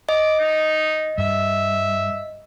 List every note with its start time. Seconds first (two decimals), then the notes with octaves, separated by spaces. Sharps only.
0.09 D#5 D6
0.39 D#4
1.18 G2 E5